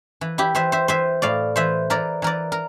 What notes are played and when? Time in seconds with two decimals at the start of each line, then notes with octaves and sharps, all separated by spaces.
0.21 E3
0.38 E4 G4
0.55 E3 C5 E5
0.72 C5 E5
0.88 E3 C5 E5
1.22 A2 D5 F5
1.56 E3 C5 E5
1.90 E3 A#4 D5
2.22 E3 A#4 D5
2.52 A#4